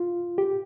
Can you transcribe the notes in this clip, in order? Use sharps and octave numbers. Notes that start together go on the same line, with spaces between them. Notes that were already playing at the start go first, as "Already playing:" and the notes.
Already playing: F4
G4